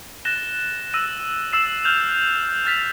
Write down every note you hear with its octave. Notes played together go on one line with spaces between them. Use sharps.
F#6 A6 A#6 E7 G7
E6 A#6 D#7
E6 A6 C7 E7
F6 G6 F7
F6 A6 B6 F7